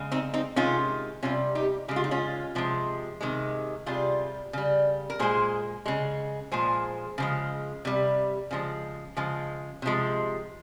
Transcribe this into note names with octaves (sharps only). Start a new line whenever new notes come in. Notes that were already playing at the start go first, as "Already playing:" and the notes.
Already playing: C#3 G#3
C4 D#4
C4 D#4
C3 D#3 G#3 C#4 F4
C3 G3 C#4 F4
D#4 G4
C#3 G#3 G4
F4
D#4
C#4 F4
C3 F3 G#3
C3 D#3 G#3
C3 G3 F4 G#4
C#3 G3
A#4
A#2 G#3 G#4 C5
C#3 G#3
A#2 F3 G#3 G#4 C5
C#3 F3 G#3
C3 G3
C#3 F3 G#3
C#3 F3 G#3
C3 F3 G#3